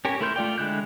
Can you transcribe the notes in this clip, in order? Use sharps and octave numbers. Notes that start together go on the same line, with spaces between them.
C#4 G4 A#4 C#5
A3 E4 A#4 C6 G6
A3 F4 D5 G5
D3 G#3 E4 F#6 G6